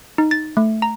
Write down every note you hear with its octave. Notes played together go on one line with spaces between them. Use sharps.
D#4
A6
A3
A#5